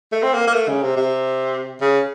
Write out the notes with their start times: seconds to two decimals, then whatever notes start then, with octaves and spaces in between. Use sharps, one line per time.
0.12 A3
0.23 C4
0.33 A#3
0.47 A#3
0.54 A3
0.68 C#3
0.82 C3
0.96 C3
1.81 C#3